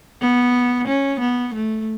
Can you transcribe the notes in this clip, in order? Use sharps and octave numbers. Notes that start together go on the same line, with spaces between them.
B3
C#4
B3
A3